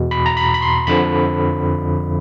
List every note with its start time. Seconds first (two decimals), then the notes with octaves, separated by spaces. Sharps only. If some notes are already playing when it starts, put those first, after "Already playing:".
Already playing: E2 B2
0.11 B5
0.26 A#5
0.37 B5
0.54 B5
0.62 C6
0.87 F2 D3 F3 B5